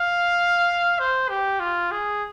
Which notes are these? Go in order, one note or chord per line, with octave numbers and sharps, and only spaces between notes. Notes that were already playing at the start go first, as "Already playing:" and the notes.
Already playing: F5
C5
G4
F4
G#4